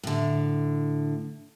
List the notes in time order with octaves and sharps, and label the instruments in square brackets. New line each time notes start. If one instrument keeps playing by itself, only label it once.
[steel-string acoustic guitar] A2 D3